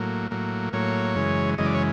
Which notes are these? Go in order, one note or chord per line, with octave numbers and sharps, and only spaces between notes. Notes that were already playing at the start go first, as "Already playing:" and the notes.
Already playing: A2 F#3 A#3
A2 F#3 A#3
A2 F#3 A#3 C#5
F#2 C#3 E3 G#3
F#2 C#3 E3 G#3 D#5
D5
C#5